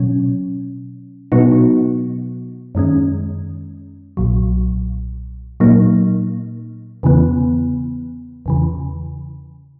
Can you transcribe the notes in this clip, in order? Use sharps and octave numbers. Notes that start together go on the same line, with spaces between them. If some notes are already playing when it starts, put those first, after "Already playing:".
Already playing: B2 F#3 C#4
B2 F#3 B3 D#4 F#4
F#2 D#3 G#3 C#4
B1 A#2 F#3
A#2 F#3 A#3 D#4
E2 C#3 E3 B3
E2 C#3 E3